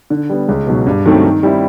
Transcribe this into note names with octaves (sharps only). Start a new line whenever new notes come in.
D3
G3 B3
C#2
B2 F#3
G2
D#3 F#3 A3 C4
D#3
G3 C4 E4